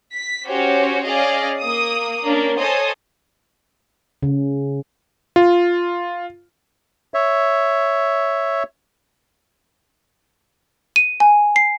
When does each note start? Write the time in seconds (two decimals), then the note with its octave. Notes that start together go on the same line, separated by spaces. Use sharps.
0.14 B6
0.46 C#4 F#4 G4 C5 C#5
1.05 C#4 G#4 D5 D#5 F5
1.60 A#3 D#6
2.24 A#3 C#4 D4 A#4
2.58 A4 C5 C#5 D#5 G#5 D#6
4.23 C#3
5.36 F4
7.14 C#5 E5
10.96 D#7
11.20 G#5
11.56 C7